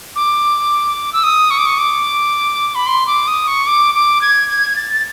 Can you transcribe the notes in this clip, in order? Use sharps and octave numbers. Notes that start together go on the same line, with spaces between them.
D6
E6
D#6
C#6
D6
C#6
D6
B5
C6
D6
D#6
C#6
D6
D6
G#6
G#6
G#6
A6
A6